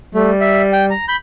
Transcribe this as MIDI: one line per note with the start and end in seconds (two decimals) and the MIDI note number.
0.15 0.93 55
0.15 0.31 57
0.41 0.62 76
0.73 0.85 79
0.90 1.05 82
1.08 1.16 83
1.08 1.16 91